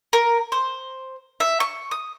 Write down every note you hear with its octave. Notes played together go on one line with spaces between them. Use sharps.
A#4
C5
E5
C#6
D#6